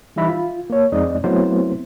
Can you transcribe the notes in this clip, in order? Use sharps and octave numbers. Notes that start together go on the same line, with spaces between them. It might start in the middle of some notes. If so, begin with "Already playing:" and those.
E3 G3 D#4 E5 B5
F4
A#3 C#5
F2 G#3 C4 D#4 D5 D#5
F#3 A3 B3 C4 E4 C5